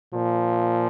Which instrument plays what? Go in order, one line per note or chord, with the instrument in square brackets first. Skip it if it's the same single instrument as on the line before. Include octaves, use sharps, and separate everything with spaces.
[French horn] A#2 [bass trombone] F3